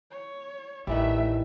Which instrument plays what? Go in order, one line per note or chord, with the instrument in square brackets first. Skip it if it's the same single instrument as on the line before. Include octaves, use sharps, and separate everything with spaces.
[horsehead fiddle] C#5
[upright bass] A1 [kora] D#3 E3 G3 [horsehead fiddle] A3 E5